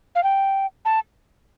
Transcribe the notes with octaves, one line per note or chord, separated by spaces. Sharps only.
F5
G5
A5